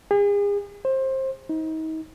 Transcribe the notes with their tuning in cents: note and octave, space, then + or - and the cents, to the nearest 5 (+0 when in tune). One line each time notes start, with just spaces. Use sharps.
G#4 -40
C5 +20
D#4 +35